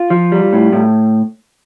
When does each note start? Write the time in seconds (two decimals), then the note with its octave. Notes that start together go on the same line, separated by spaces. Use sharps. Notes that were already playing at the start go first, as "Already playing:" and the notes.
Already playing: F4
0.10 F3
0.32 G3
0.53 A2
0.73 A2